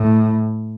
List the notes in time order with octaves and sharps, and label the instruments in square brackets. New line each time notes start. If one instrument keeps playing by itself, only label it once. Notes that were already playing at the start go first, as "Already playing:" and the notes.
Already playing: [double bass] A2